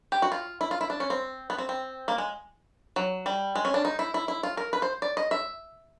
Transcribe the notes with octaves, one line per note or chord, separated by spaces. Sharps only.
G4
F#4
F4
E4
F4
E4
D4
C#4
C4
B3
C4
C4
A#3
G#3
F#3
G3
G#3
C#4
D4
D#4
E4
E4
E4
F4
A#4
B4
C5
D5
D#5
E5